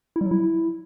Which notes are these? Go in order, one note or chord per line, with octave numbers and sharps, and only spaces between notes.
E4
G3
F#3
E4